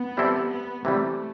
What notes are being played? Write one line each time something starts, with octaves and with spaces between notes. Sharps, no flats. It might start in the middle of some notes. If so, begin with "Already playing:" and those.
Already playing: B3
E3 G3 C4 E4 A4
B3
C3 E3 G3 A3